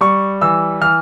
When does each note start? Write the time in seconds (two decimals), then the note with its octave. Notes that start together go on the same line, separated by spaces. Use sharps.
0.01 G3 C#6
0.41 E3 E6
0.81 E3 F6